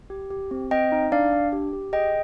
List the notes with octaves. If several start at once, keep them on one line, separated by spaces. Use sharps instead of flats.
G4
G4
C4
C4 D#5 G5
D#4
D4 D5 F5
D4
G4
G4
G#4 D#5 G5